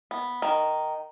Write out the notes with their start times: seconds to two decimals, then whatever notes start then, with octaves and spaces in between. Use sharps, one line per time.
0.11 B3
0.42 D#3